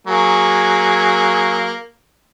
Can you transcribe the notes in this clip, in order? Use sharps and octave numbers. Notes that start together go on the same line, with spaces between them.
F#3 A#3 G#4